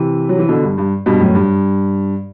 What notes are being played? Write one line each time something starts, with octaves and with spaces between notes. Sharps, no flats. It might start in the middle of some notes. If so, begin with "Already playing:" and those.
Already playing: C3 E3
F#3
E3
B2 D3
G2
G2
G2 B2
F#2 A2
G2